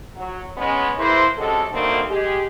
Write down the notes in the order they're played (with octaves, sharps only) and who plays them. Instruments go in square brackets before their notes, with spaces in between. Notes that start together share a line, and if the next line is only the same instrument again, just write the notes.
[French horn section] F#3
G#3 B3 C#4
A#3 E4 G#4 B4 C5
C3 G#3 C#4 F#4 A4
B2 D3 D#3 A3 A#3 C4
G#3 G4 G#4